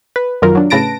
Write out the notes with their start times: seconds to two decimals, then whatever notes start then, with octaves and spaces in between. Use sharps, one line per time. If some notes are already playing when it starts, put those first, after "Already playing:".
0.16 B4
0.42 F#2 D#3 F#3 F4 A#4
0.55 F#3 D4
0.70 A2 C#3 B4 A5 A#6 D7